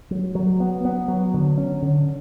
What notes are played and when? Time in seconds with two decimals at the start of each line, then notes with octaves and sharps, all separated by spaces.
0.11 F#3
0.35 F#3
0.60 B3
0.85 B3
1.08 F#3
1.34 D3
1.58 C#4
1.82 D3